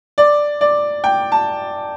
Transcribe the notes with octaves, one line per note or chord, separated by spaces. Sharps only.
D5
D5
G5
A5